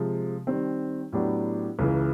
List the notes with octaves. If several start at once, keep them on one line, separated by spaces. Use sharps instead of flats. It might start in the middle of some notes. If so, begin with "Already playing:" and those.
Already playing: C3 F3 G#3
D#3 G3 C4
A2 F#3 B3 D4 G4
C#2 C#3 E3